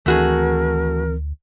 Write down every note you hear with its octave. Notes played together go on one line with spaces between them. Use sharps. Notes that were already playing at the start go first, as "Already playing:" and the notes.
D2 D#3 E3 A3 C4 F#4 G#4 A#4